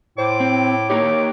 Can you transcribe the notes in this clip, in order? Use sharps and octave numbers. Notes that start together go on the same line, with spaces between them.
A2 C5 D6
C4
A#3 D#4 G4 C#5 D6